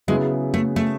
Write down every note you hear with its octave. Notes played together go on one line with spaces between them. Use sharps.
C#3 F#3 G#3 B3 E4 G#4
A3
A3